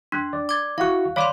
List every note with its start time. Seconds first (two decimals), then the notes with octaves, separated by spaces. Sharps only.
0.12 D4 C6 F#6
0.33 D5
0.49 D6 G#6 A6
0.78 E4 F#4 F5 C#6 F#6
1.16 C#5 D5 F5 B5 C6 D6